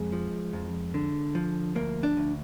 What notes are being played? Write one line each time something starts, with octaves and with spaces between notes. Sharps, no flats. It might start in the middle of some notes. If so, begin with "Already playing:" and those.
Already playing: F2 G#3
F3
F2
D3
F3
D2 A#3
D4
D2